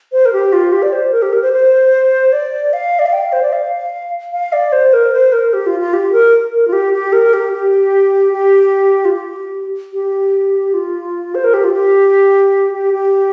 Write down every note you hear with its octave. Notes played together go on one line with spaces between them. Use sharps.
C5
A#4
G4
F4
G4
D5
C5
A#4
G4
A#4
C5
C5
D5
F5
D5
F5
G5
F5
C5
D5
F5
F5
D5
C5
A#4
C5
A#4
G4
F4
F4
G4
A#4
A#4
F4
G4
G4
A#4
G4
G4
G4
F4
G4
G4
F4
C5
A#4
G4
F4
G4
G4
G4